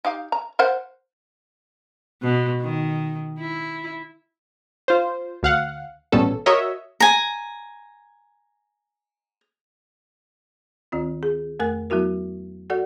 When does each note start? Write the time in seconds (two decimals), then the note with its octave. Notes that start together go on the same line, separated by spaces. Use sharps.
0.05 D#4 G4 F5
0.32 A#5
0.59 A#4 C5 F#5
2.22 B2
2.61 D#3
3.40 E4
4.88 F4 C5
5.43 D2 F5 F#5
6.12 A1 A#2 G3 B3 C#4 A4
6.46 F#4 A#4 C#5 D#5 E5
7.00 G#5 A#5
10.92 D2 D#3 C4 F4
11.23 G#4
11.59 F2 A3 A#4 G#5 F#6
11.90 F#3 B3 E4 F#4 A#4
12.70 F#4 A4 D5 F#5